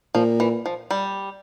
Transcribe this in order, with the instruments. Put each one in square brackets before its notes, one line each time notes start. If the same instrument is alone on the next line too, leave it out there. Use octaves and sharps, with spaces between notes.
[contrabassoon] A#2 [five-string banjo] F3
[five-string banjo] E3
F3
G3